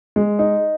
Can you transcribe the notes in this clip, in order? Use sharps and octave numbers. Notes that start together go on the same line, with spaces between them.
G#3
D#4